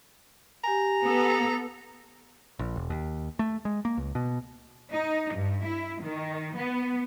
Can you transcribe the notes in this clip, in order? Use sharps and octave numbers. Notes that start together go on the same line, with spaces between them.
G4 G#5 A#5
B3 A4
A#1
E1
D#2
A3
G#3
A#3
C#2
B2
D#4
G2
E4
D#3
B3